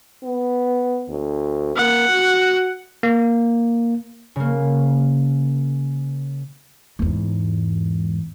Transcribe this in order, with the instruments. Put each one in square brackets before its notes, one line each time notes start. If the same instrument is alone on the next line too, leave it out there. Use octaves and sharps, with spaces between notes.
[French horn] B3
D2
[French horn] A#3 [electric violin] F#5
[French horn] F#4
[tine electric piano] A#3
[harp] C#3 A#3
[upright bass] E2 G#2